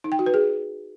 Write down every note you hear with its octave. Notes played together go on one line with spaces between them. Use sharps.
D#4
G5
F#4
B4
G#4